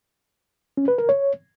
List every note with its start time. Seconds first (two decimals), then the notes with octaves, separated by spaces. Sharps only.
0.77 C#4
0.88 B4
0.98 A#4
1.09 C#5